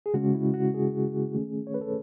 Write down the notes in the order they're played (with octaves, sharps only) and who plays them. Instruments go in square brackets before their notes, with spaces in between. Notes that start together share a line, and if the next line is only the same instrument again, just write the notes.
[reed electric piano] G#4
C#3 G#3 C#4 F#4
E4
F#4
G#4
D#3 A3 C#4
C#5
B4
A4